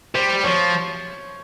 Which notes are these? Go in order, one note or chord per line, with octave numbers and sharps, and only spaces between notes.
G3 C5
F3 C#5